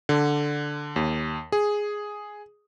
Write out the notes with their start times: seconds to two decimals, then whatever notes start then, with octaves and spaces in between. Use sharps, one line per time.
0.09 D3
0.96 D#2
1.52 G#4